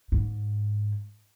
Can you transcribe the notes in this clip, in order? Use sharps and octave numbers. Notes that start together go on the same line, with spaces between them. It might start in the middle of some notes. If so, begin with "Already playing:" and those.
G#2